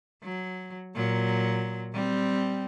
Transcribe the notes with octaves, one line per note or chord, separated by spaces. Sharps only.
F#3
A#2 F#3
G3 C4